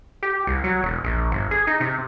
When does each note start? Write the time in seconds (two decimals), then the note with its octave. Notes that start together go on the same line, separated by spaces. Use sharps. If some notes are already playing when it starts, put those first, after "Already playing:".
0.23 G4
0.47 C2
0.64 F#3
0.83 E1
1.04 A#1
1.32 G1
1.51 G#4
1.67 D#4
1.80 C3